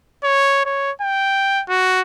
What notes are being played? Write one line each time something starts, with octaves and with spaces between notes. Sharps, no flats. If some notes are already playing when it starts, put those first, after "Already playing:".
C#5
C#5
G5
F#4